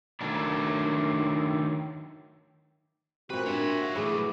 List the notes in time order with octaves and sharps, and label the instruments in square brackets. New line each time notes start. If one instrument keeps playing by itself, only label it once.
[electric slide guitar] D#3 F#3 A3 D4
[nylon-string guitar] A#2 C4 [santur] G3 [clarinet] F#4 [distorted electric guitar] B4
[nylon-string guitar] A#2 D4 [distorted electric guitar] C#5 E5
[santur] F5 F#5
[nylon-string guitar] A2 G#4 [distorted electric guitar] E3 F#3 [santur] B4 D6